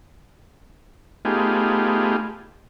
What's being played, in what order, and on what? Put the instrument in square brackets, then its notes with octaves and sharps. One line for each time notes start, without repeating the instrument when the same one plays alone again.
[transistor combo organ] A3 B3 D#4 F4 G4 G#4